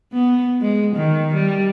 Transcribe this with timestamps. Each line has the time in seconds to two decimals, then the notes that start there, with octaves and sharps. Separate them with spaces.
0.13 B3
0.61 G#3
0.96 D#3
1.34 G3